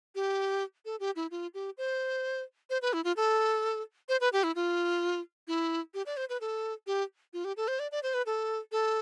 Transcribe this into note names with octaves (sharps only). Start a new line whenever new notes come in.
G4
A4
G4
E4
F4
G4
C5
C5
B4
E4
F4
A4
C5
B4
G4
E4
F4
E4
G4
D5
C5
B4
A4
G4
F4
G4
A4
C5
D5
D5
C5
B4
A4
A4